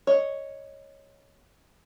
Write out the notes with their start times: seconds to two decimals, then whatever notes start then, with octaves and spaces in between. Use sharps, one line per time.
0.07 C#5 D#5